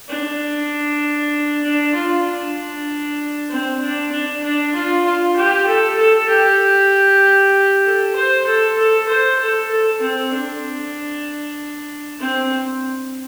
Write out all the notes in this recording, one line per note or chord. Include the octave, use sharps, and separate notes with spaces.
D4
D4
F4
D4
C4
D4
D4
D4
F4
F4
G4
A4
A4
G4
A4
C5
A4
A4
C5
A4
A4
C4
D4
C4